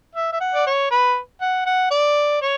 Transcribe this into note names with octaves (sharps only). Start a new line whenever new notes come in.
E5
E5
F#5
D5
C#5
B4
F#5
F#5
D5
C#5